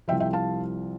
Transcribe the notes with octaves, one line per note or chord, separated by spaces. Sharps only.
C2 C3 F3 E5 G5
E5 G5
F5 A5